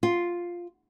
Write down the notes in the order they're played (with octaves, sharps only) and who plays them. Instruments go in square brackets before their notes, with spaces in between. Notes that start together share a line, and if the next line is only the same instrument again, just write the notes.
[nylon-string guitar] F4